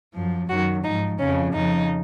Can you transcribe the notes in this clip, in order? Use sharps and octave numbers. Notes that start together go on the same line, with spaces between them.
F#2 F3
F#2 D#3 F#3 F#4
G#2 F3 D#4
F2 C#3 F3 C#4
F2 C#3 F3 D#4